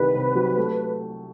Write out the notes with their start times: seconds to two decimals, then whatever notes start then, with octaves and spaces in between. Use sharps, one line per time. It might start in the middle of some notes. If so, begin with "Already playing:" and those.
Already playing: C2 D#3 B4
0.15 C3
0.35 F#3
0.57 A3